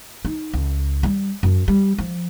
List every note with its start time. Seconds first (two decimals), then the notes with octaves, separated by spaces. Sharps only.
0.25 D#4
0.54 C#2
1.03 G3
1.43 F#2
1.68 G3
1.98 F3